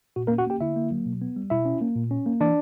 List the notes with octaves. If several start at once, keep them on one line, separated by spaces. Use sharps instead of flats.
A#2 F#4
A#3 A#4
C#4
F#4 F#5
A#3 G4 G5
D3 E4 E5
A#3
F#3
B2
B3
G3
B2 E4 E5
C#4
A#3
A#2
C#4
A#3
E3 D4 D5